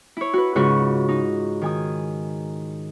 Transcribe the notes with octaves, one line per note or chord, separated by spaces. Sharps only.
E4 C#5
F#4 B4
G#2 C#3 F4 F#4 C#6
D#4
D#3 G#5 D#6